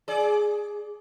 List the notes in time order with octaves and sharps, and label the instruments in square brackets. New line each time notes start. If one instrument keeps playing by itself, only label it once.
[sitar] G#4 D5